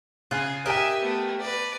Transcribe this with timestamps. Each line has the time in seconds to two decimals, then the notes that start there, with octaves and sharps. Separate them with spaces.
0.31 C#3 F4 G#4 F#6
0.66 G4 A#4 D#5 E5 G5 G#5
1.02 A3 B3
1.40 B4 D5